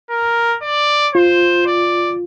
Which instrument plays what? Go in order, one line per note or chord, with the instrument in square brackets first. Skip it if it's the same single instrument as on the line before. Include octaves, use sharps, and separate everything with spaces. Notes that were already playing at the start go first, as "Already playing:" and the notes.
[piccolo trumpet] A#4
D5
[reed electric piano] F4 [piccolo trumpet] C5
[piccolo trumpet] D5